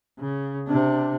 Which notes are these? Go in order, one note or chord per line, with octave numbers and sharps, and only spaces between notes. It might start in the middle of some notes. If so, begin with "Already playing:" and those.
C#3
C3 D4